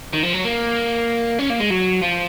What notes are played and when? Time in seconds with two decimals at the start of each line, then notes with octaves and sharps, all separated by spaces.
0.14 D#3
0.23 F3
0.33 F#3
0.45 A#3
1.39 C#4
1.50 A#3
1.60 G#3
1.70 F#3
2.01 F3